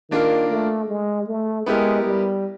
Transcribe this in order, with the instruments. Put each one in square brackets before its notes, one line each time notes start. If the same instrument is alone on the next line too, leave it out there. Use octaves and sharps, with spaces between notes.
[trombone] D#3 [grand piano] A#3 D4 F4 A#4
[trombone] A3
G#3
A3
[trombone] G#3 [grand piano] B3 E4 G4 A#4
[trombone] G3